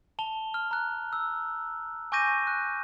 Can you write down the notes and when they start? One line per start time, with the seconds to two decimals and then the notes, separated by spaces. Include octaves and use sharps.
0.19 A5 F7 G7
0.54 F6
0.71 A#5 F#6
1.13 E6
2.12 G#5 C#6 D6 G6 A#6 D#7
2.47 F#6